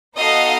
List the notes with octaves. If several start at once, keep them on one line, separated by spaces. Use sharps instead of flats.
B3 D#4 F#4 A4 D#5 F5